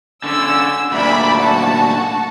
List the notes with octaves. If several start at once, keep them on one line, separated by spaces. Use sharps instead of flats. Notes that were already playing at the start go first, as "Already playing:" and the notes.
D3 C#4 E6
D2 A#2 D5 E5 B5
F#4 A5